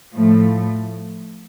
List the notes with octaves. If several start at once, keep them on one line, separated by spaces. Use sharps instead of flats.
A2 F3 A3